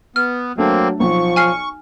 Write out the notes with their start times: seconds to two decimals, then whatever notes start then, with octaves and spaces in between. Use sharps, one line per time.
0.16 B3 F6
0.58 F#3 A3 A#3 C4 D4
1.00 B1 F3 C#6
1.36 G#5 F6 C7